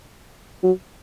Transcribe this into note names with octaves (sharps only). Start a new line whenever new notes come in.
F#3